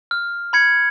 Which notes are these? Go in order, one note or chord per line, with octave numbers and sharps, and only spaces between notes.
F6
B5 G#6 C#7